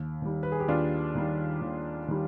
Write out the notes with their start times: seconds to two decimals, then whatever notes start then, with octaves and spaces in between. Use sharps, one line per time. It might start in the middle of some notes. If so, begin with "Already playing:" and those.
Already playing: D#2
0.22 D#3 G3
0.43 B4
0.52 G#4
0.60 G4
0.68 D#2 D4 F4
1.15 D#3 G3
1.62 D#2
2.08 D#3 G3